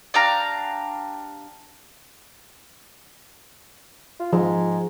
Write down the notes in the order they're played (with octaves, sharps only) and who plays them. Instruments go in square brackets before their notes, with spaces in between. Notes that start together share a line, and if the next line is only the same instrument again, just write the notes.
[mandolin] D4 G4 F5 A#5
[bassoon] F4
[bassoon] G#2 [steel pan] F3